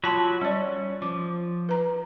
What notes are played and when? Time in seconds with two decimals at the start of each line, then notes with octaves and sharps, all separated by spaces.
0.04 F#3 F4 F#4 A5 B5 C6
0.41 G3 C#4 D5
1.02 F3 D6
1.69 B4 A#5